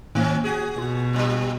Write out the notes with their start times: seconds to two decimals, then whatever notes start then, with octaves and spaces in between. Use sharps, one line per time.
0.15 A2 D#3 A#3 C4 C#4
0.44 F#4 G#4
0.78 B2 F4
1.13 G2 A#2 G3